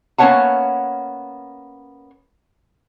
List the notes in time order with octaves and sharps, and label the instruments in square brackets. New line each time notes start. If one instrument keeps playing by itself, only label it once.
[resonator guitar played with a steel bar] A#3 B3 C#4 C#5 F#5 A5